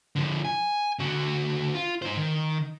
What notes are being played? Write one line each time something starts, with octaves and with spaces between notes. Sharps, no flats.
D3 F3
G#5
D3 F#4
F4
D#4 C5
D#3